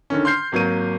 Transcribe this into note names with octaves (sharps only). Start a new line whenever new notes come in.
D3 D#3 C#4
C6 F6 G6 C7
G#1 F#3 A#3 D#7